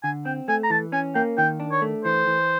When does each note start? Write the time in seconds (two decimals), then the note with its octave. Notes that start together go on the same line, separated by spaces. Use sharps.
0.04 D3 G#5
0.25 C4 G5
0.48 A3 G#5
0.64 A#5
0.70 E3 A5
0.92 C#4 G#5
1.15 A#3 G5
1.38 D#3 G5
1.60 D4
1.72 C#5
1.82 A3
2.04 E3 C5
2.27 E3